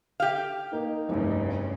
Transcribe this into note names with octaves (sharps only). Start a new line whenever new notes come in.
G4 F5
A#3 D#4
F1 C2 G2 C#3